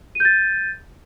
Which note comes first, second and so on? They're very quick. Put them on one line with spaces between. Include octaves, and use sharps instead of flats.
D#7 G6 A6